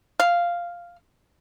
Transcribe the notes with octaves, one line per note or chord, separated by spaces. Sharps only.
F5